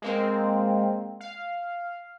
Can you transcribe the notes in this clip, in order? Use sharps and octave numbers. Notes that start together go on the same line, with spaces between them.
G#3 A#3 C4
F5